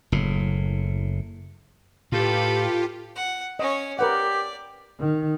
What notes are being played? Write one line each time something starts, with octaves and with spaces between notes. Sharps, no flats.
F#1 A2
A2 F4 G4 A4 B4
F#5
C#4 C#5 D#5
G4 A#4 B4 D5 F#5
D#3